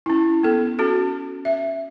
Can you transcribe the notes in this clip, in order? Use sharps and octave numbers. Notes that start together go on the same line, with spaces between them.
C#4 E4
B3 A4
C#4 F#4 A4
E5